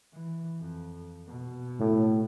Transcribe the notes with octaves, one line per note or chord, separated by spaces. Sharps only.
E3
F2
B2
A2